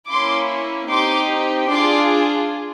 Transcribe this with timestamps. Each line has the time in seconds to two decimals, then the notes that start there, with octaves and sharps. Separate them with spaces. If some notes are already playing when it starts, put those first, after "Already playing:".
0.09 A#3 C#4 E4 C6 D6
0.90 C4 D#4 G4 C6 D6
1.71 D4 F4 G#4 C6 D6